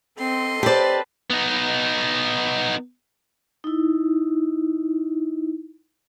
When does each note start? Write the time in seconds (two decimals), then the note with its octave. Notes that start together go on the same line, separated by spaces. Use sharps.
0.18 C4 A4 D#5 C6
0.63 C4 G4 B4 C5 D5 A5
1.30 B3 D#4
3.64 D#4 E4